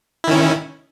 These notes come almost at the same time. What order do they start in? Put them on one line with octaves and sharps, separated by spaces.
E4 D#3 C#4